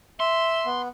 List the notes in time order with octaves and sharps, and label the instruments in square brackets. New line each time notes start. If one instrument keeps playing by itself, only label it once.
[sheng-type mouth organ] E5 [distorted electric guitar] C6
[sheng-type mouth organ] B3